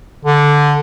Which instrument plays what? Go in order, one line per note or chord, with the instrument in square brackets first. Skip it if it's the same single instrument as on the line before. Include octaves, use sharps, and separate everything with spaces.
[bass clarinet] D3